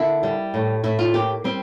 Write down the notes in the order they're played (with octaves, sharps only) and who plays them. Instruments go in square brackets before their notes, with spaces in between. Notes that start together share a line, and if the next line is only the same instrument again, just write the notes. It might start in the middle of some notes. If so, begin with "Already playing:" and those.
Already playing: [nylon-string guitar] D3 A#3 E4
G3
A2
A2 E4
F4
A#3 G4
G3 C4